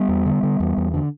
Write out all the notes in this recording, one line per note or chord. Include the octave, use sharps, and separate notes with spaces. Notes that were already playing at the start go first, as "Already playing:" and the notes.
Already playing: G3 B3
E2
D3
D3
E2
E2
D3